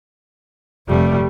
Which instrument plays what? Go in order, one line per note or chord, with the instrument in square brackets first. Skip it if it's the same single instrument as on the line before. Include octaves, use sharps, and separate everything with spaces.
[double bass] F1 A3 [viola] G3